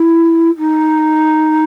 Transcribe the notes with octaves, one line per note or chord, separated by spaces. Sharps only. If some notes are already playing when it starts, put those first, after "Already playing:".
Already playing: E4
D#4